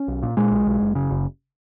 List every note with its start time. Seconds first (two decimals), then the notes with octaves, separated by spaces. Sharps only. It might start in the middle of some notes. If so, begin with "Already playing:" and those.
Already playing: C#4
0.08 B1
0.23 A#2
0.37 A#2 G#3
0.52 B1
0.67 B1
0.81 F#1
0.95 C#3
1.11 F#1